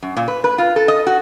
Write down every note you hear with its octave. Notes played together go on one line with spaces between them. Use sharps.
F#2
A#2
B4
B4
F4
A4
D#5
F#4